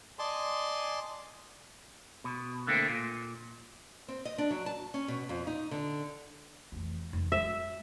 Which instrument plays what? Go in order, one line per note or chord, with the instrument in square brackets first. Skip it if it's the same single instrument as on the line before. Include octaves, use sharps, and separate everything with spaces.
[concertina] D5 D#5 G#5 A5 C6
[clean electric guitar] B2
D3 A3 A#3 C4
A#2
[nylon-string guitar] C4
D#5
D4
F#3
A5
C#4
B2
F2
D#4
D3
[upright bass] F1 E3
F1
[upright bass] G#3 [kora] E5